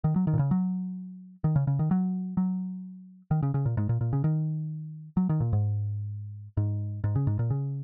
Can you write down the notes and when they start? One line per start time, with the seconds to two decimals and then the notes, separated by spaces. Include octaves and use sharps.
0.04 D#3
0.16 F#3
0.27 D#3
0.34 A#2
0.39 C#3
0.51 F#3
1.44 D#3
1.56 C#3
1.67 C#3
1.79 D#3
1.91 F#3
2.37 F#3
3.31 D#3
3.43 C#3
3.54 C#3
3.66 A#2
3.77 G#2
3.89 A#2
4.01 A#2
4.13 C#3
4.24 D#3
5.17 F#3
5.29 D#3
5.40 A#2
5.53 G#2
6.57 G#2
7.04 G#2
7.16 C#3
7.27 G#2
7.39 A#2
7.50 C#3